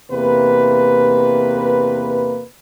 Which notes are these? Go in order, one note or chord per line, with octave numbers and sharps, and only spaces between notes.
E2 C3 A#3 B4